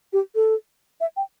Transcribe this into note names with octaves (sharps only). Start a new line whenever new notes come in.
G4
A4
E5
G5